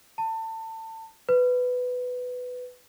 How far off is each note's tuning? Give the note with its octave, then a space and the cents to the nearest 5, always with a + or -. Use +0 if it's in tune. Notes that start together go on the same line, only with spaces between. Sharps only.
A5 +25
B4 +10